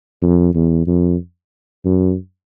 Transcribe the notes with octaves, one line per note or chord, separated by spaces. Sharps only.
F2
E2
F2
F#2